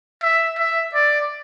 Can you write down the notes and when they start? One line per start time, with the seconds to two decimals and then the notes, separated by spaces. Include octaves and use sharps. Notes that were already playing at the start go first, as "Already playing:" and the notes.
0.23 E5
0.58 E5
0.94 D5